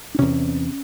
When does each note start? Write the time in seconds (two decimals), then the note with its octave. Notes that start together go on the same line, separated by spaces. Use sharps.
0.15 D4
0.18 E2 C3 C#4